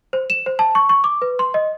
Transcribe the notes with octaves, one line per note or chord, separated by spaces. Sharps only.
C5
E7
C5
A5
C#6
C#6
D6
B4
C6
D#5